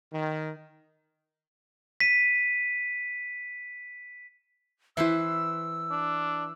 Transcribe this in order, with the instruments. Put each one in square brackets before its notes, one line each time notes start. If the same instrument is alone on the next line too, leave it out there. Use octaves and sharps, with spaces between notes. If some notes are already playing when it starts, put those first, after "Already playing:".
[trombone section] D#3
[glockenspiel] B6 D#7
[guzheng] E3 B4 C5 [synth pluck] E4 E5 [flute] E6
[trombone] D4